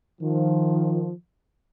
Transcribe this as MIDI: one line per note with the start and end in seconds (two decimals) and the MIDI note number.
0.21 1.11 51
0.21 1.11 53